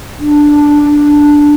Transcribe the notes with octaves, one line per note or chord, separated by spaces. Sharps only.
D4